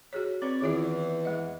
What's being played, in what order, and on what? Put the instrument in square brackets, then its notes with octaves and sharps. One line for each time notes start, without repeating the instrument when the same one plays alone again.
[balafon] F#4 G#4 C#5
[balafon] C4 [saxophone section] B4 C#5 D5
[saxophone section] E2 [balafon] D#3 F4 D5
[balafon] G#3 D#5